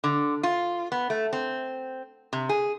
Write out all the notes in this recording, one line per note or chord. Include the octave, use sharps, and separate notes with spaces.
D3
F4
B3
A3
C4
C3
G#4